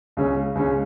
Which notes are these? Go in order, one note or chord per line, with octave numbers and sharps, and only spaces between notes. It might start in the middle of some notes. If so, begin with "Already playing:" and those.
C#2 C#3 G#3 C#4
C#2 C#3 G#3 C#4